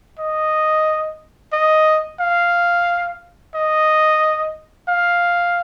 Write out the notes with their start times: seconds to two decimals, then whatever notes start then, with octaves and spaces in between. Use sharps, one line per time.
0.19 D#5
1.53 D#5
2.20 F5
3.55 D#5
4.88 F5